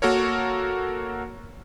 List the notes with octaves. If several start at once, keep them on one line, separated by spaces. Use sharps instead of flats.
A#3 F#4 A4 A#4 C#5